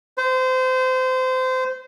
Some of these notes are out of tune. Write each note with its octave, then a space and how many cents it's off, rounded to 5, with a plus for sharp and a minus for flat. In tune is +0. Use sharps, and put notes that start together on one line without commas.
C5 -25